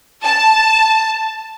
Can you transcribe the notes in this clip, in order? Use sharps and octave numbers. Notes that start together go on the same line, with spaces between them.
A5